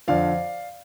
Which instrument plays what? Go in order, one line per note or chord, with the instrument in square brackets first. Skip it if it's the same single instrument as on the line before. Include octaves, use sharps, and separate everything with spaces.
[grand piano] F2 D3 F3 D5 F5